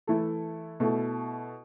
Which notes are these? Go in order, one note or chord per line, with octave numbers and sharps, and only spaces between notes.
E3 A3 E4 A4
B2 A3 E4 A4